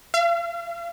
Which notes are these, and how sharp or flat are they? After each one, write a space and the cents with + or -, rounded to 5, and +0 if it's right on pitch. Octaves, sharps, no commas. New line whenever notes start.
F5 -40